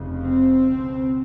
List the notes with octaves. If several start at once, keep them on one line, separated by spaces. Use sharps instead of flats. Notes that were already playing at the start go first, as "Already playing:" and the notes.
Already playing: F1 F2 C#3
C4
C#2 B2